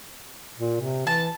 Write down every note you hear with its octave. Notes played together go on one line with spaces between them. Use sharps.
A#2
C3
E3 A5